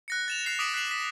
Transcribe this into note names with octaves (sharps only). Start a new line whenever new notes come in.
F#6 A#6 C#7
A6 E7 F7
F#6 C7 F7
D6 D#6 B6 D7 E7 F#7
F#6 B6 C7 E7 F#7
B6